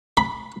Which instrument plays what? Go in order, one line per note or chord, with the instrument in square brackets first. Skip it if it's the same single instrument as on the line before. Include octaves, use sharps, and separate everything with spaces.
[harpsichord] B5